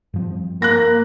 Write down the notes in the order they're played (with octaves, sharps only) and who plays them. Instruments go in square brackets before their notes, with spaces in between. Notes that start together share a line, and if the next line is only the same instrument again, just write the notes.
[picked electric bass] G2 F3 C4
[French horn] A#3 [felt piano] F#6 A#6